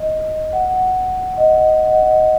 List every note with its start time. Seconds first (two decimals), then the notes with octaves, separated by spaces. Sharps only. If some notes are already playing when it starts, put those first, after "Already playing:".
Already playing: D#5
0.53 F#5
1.34 F#5
1.37 D#5
1.59 D#5
1.69 F#5
1.80 F#5
1.89 D#5
2.01 D#5
2.11 D#5